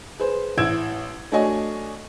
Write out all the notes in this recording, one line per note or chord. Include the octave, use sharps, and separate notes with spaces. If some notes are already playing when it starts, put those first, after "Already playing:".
G#4 B4 C5
A1 E4 E6 G#6 D7 E7
A3 D4 F#4 C#5 D#5 G#5